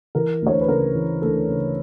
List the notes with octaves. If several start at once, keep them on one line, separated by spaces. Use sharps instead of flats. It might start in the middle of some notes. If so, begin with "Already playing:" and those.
E3 A#4
D2 C#5
C5
B4
C#3 A#4
E3
D2 A4
C#3